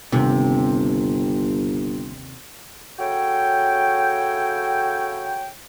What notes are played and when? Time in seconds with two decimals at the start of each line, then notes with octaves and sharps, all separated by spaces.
0.12 G1 D#2 C3
2.98 C#3 F#4 A4 C#5 G5